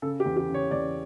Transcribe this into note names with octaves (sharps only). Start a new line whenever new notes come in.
C#3 A4
G4
E2
G4
C#3
C#5
E2 D5